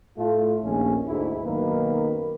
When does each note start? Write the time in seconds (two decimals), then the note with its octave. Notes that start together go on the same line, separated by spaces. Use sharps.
0.17 A2 A3 F4
0.64 A#1 D#2 C#4
1.07 D2 G#2 E4
1.43 B1 F#2 D#3 A#3 A#4 B4